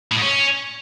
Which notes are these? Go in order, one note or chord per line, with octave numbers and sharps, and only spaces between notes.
A2
G#2
C#4